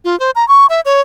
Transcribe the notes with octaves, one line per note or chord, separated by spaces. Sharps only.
F4
C5
A#5
C#6
E5
C#5